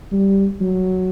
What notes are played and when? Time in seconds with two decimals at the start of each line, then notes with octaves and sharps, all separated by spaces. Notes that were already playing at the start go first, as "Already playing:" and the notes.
0.12 G3
0.61 F#3